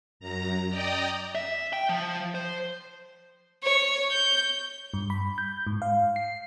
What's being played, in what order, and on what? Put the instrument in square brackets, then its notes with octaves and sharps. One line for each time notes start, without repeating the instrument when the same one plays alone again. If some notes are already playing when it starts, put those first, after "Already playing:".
[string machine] F#2 A#5
D5 D#5 G5 A#5 D#6
[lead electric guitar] E5
G5
F3
C5
[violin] C#5
G6
[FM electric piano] G2
B5
G6
G#2
F5
C7